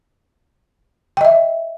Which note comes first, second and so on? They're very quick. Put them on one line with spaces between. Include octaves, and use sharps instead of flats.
G5 D#5 E5